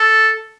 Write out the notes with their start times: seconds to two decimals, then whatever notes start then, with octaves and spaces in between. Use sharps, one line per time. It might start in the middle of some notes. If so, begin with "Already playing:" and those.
Already playing: A4